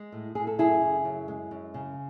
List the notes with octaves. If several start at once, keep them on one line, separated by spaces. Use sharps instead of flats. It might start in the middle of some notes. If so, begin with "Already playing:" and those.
Already playing: G#3
A2
A2 G#4
A4
F#2 E4 G#4
C#3
F#2
G#3
F#2
C#3